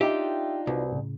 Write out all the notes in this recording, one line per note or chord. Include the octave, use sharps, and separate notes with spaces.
D4 D#4 F4 G4 E5
C2 F#4 B4 C5
A2 C#3